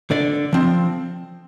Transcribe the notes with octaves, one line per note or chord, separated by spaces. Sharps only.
D3 D5
F3 C4